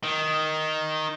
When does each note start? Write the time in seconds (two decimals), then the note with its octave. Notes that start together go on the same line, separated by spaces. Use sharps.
0.03 D#3